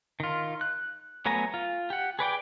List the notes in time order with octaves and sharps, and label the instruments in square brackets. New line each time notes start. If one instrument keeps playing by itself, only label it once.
[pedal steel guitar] D#3 F4
F#6
F#3 A3 B3 G#5 A#5
F4
G4 F#5
G#4 B4 D5 G5